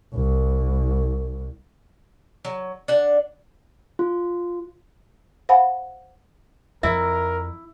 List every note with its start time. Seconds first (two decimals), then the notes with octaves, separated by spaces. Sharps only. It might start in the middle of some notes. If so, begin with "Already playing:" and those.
0.15 C2
2.45 F#3
2.88 D4 F#5
3.99 F4
5.49 C5 F5 F#5 G#5 B5
6.83 F2 E4 A#4 E5 E6